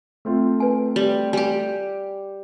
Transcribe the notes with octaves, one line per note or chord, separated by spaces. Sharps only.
A3 C4 F4
B4 G#5
G3
G3 G4 G#5